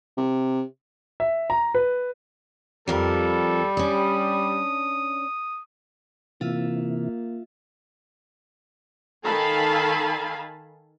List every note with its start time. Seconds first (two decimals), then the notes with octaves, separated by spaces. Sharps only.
0.17 C3
1.20 E5
1.50 A#5
1.75 B4
2.88 F2 F3 G3 A4 A#4
3.77 C#4 D4 D#6
6.41 C3 E3 A#3 F4 E5
9.25 D#3 A4 F5 G#5 A5 B5